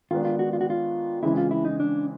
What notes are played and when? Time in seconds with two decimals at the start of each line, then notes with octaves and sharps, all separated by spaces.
0.11 D#3 G#3 B3 D4 F4
0.25 F4
0.39 F#4
0.53 F4
0.61 F#4
0.70 F4
1.23 C#3 E3 G#3 C4 E4
1.37 F4
1.51 E4
1.65 D#4
1.80 D4